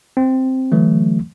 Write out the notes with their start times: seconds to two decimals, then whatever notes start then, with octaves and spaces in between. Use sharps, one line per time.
0.17 C4
0.72 D3 E3 F#3 A3